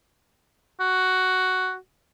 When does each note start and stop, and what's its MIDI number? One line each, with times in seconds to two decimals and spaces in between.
0.80 1.76 66